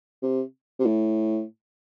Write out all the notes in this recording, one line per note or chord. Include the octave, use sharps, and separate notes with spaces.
C3
C3
A2